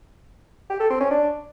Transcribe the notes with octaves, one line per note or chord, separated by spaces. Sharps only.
G4
A4
C4
C#4
D4